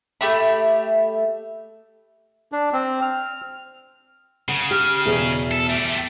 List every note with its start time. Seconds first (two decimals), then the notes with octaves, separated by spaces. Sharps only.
0.21 A3 G4 E5 B5
2.52 D4
2.73 C4
3.02 F6
4.49 C#3 F#5
4.71 G4 F6
5.06 E2 B2 G#4 E5
5.51 A4
5.69 A3 G4